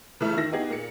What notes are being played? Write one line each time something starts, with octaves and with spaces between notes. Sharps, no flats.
C#3 E3 A3
D#3 E4 A#6
B3 D#4 G4 G#4
A#2 C#7